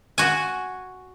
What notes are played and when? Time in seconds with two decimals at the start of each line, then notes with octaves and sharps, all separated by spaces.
0.18 F#4 G#5